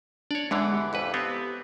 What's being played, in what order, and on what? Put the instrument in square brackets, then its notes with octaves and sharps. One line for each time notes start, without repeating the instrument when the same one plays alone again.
[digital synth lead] D4 [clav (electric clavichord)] C#5 D5
[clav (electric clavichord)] E2 D3 E3 [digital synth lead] G#3
[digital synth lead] G4
[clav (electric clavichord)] A1 F2 B4
B3 C4